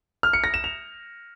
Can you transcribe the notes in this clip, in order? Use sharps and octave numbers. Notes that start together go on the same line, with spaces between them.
F6
C#7
A#6
E7
F7